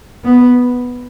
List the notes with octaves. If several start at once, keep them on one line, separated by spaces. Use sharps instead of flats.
B3